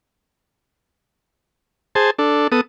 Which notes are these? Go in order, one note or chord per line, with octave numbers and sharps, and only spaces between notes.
G#4 C5 A5
D4 A4
B3 A4 D#6